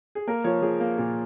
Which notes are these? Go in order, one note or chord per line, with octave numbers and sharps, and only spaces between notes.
G#4
A#3 A#4
F3 C#5
F3 G#4
A#3
A#2